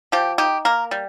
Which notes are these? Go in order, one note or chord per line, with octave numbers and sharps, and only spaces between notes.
F3 G4
D#4 G4
A#3 A#4
G3